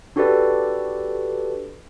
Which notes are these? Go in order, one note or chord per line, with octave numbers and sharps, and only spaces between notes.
D4 F#4 G4 A4 B4 D5